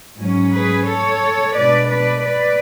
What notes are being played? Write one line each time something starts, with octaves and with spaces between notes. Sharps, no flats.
G#2 F#3 C#4
G#4 B4
A4 C#5
B2 G#3 D4 B4 D5
B4 D5
B4 D5